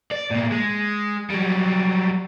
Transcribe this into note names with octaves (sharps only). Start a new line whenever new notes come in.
D5
A2 A#3
G#3
F#3 G3